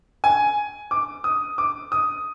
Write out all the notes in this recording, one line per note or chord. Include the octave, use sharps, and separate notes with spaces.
G#5
D6
D#6
D6
D#6